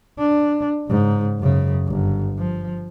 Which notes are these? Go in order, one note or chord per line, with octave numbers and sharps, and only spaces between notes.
D4
G#2 C#3
F#2 C#3
G1
F3